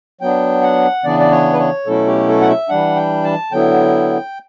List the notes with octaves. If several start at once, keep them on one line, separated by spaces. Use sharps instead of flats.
F#3 B3 D4 G5
F#5
C#3 E3 B3 D4 D5
D5
C#5
B4
C#5
B2 F#3 A3 C#4 E4 A4
G4
A4
F#5
E5
E3 G3 D4 F#5
G5
A5
D3 F#3 B3 E4 G5